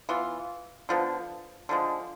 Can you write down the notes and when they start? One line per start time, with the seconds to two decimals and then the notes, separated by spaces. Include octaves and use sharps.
0.09 E3 B3 F4
0.89 D3 F3 B3
1.69 D3 F3 G#3